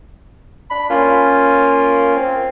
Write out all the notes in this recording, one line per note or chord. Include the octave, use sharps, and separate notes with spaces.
D4 B5
A#3 C#4 F4
C4